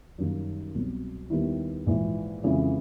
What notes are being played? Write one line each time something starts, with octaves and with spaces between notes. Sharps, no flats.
F#2 D#3 G3 A#3 D#4
C2 B2 F#3
D#2 D#3 G3 B3 E4
A#1 G#2 E3
F2 C#3 E3 G#3